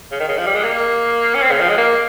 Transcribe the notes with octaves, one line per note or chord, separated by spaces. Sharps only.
C#3
D#3
C#3
F3
G3
G#3
A#3
C#4
C4
C#3
F3
G#3
A#3